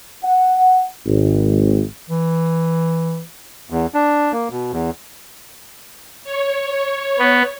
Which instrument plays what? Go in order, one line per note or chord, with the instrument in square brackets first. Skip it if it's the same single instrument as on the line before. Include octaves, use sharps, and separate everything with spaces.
[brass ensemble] F#5
G#1
[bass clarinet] E3
[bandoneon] E2
D4
A#3
B2
E2
[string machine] C#5
[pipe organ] B3